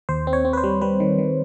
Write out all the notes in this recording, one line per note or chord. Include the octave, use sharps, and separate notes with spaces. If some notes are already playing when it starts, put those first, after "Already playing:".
D#2 C5
C4
C#5
C4
B4
C5
G3
G3 B4
D#3
D#3